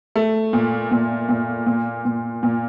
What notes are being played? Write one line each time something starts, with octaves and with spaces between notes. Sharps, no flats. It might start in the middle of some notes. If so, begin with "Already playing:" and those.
A3
A#2
A#2
A#2
A#2
A#2
A#2